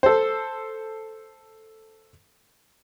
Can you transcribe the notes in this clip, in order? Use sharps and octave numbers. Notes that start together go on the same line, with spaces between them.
A4 C5